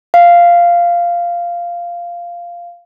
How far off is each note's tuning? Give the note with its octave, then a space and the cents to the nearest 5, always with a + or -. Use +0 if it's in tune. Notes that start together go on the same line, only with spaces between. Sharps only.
F5 -10